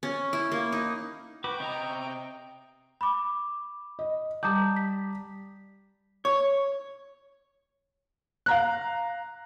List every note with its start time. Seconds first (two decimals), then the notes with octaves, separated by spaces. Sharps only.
0.03 C#4
0.33 E4
0.52 A#3
0.72 D#4
1.44 F#4 B4 G5 D6
1.60 C3 D#5 A#5 C#6
3.01 B5 D6
3.99 D#5
4.43 G3 A5 A#5 D6 D#6 G6
4.76 B6
6.25 C#5
8.46 F5 A#5 F#6